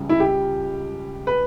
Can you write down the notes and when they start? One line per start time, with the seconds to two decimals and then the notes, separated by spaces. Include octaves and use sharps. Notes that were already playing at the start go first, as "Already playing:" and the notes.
Already playing: C#2 C#3 G3
0.09 E4
0.20 G4
1.27 B4